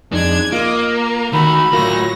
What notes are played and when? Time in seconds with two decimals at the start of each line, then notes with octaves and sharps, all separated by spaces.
0.12 F2 G#3 D4 D#4 G#6
0.52 A#3 F4 D#5 D6
0.93 A#5
1.33 D#3 A3 F#4 B5
1.73 A2 F#3 A3 F4 F#4 A#4 A#6